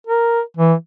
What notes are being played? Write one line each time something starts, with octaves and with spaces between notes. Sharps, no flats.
A#4
E3